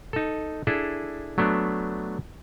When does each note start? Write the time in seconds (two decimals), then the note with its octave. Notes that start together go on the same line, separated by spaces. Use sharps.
0.13 D#4 A4
0.67 D4 E4 G#4 A4
1.38 F#3 A3 B3 D4